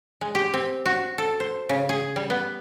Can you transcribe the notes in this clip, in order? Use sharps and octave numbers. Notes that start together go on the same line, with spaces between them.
G#3
G4
C4
F#4
A4
C5
C#3
G#4
G3
B3